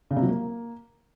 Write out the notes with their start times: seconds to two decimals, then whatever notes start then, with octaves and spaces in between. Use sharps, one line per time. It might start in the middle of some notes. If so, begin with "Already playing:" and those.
0.11 C#3
0.17 C3
0.23 F#3
0.29 A#3